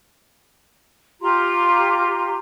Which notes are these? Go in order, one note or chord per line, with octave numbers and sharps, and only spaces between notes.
F4 G4 A#5 C6